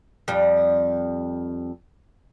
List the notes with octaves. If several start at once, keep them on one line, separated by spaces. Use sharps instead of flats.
F2 G3